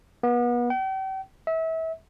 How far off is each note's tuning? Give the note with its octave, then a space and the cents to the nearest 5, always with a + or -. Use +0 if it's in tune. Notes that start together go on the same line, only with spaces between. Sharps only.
B3 -35
G5 -40
E5 -30